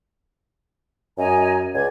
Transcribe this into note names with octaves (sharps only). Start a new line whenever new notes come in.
F#2 D#5 G#5 A#5
C#2 D5 G#6